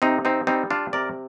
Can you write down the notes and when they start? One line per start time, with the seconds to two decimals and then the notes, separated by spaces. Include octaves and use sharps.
0.02 C3 C4 D#4
0.25 C4 D#4
0.47 G3 C4 D#4
0.71 D4 F4
0.93 C3 A#4 D5